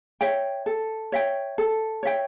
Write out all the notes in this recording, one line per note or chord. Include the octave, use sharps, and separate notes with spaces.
C#5 E5 G5
A4
C#5 E5 G5
A4
C#5 E5 G5